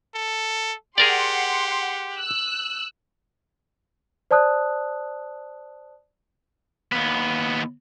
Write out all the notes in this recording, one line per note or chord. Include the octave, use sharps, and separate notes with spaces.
A4
G4 G#4 A#4 D5 F#5 C6
E6 F#6
C5 D5 A5 D#6 F#6
D#2 B3